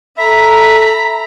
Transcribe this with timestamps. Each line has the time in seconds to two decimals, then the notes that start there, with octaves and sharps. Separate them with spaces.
0.18 A4 E5 A#5 B5 B6